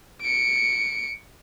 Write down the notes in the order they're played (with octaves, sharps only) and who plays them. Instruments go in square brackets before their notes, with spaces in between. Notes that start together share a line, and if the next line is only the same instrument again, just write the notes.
[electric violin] C#7 D7